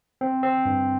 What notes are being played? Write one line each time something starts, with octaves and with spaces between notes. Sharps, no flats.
C4
C4
G2